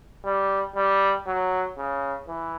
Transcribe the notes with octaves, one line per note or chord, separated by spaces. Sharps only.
G3
G3
F#3
C#3
E3